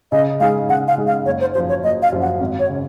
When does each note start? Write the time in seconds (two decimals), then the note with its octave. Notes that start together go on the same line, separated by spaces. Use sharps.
0.12 C#3 D#5
0.40 G#3 D#4 G#4 F5
0.69 C#3 F#5
0.88 F5
0.98 G#3 D#4 G#4
1.07 F5
1.26 F#1 C#5
1.40 C5
1.54 F#2 F3 C5
1.69 C#5
1.83 F#1 D#5
2.02 F5
2.12 F#2 F3
2.22 F#5
2.41 G#1
2.59 C#5
2.69 C#3